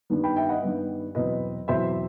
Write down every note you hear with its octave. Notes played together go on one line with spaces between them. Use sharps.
G2 D#3 G3 B3
G5 B5
E5 G5
D#5 F#5
G2 D#3 G3 B3
E2 B2 F#3 C4 B4 D#5
E2 B2 F#3 C4 C5 E5